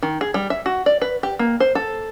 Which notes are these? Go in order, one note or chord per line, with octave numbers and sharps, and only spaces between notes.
D#3
G#4
G3
E5
F#4
D5
B4
G4
A#3
C5
A4